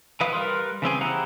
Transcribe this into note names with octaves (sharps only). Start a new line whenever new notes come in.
E3 E4 B4 F5 D#6
G3 A#4 B4 C6
C#3 E3 C4 G#4
E4 G4 G#4 F#5 A#5